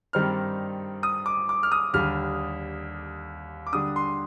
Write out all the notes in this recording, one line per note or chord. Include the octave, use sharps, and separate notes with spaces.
G2 D#3 G3 C4 D#4 F6
D#6
D6
D6
F6
D#6
D#2 D3 G3 F6
D6
D3 G3 D4 D#6
C6